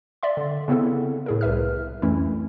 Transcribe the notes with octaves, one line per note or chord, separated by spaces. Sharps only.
D5 E5 C6
D3
C#3 B3 C4 E4 A4
A2 G#4 A#4
C2 B4 E5 F6
F2 E3 A3 C#4 E4